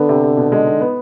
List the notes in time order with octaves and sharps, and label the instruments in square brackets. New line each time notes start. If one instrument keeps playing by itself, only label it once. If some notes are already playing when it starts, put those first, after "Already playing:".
Already playing: [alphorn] D3 [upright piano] B3
[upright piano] C3
C3
B2
G#3
D#4
B3